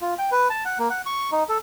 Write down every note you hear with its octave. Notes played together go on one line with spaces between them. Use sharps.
F4
G5
B4
A5
F#5
A#3
F#5
C#6
D#4
A4